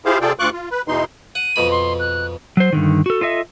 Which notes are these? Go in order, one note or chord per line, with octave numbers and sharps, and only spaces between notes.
E4 F4 G4 G#4 C5 F5
C3 F4 G#4 A4 D5 G5
D2 F4 C#6 D6 F#6
F4
B4
E2 B2 E3 D#4 C6
F#5 D#7
F2 B2 B5
C6
F#6
F#3 C5
G2 D3 D#3
F#4 A4
F4 A4 D#5 E5